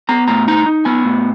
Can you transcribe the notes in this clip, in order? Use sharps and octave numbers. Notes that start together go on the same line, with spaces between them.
B3 A#5
A2 A#5
D#4 A#5
D#4
B3 G#5
A2